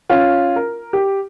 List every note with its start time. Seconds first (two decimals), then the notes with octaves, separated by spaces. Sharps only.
0.10 C#4 F4
0.56 A#4
0.93 G4